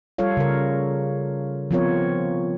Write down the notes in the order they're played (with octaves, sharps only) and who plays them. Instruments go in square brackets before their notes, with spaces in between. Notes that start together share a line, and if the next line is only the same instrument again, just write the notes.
[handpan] G3 F4 A4 C#5 F5
C#3 A#4
F3 B3 C4 F4 A#4 C#5